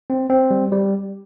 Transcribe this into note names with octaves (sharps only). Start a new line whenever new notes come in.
C4
C4
G3
G3